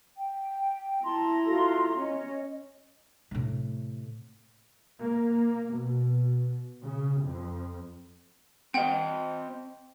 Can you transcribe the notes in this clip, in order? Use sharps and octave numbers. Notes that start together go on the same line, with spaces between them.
G5
E4 A5 A#5 C6
F4 F#4 A4
C#4 D#5
A2 C3
A#3
B2
C#3
F2
C4 C5 D#5 F#5 G5